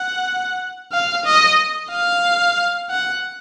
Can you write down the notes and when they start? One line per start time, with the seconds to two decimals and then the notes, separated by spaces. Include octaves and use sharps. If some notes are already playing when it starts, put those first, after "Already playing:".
Already playing: F#5
0.92 F5
1.25 D#5
1.90 F5
2.89 F#5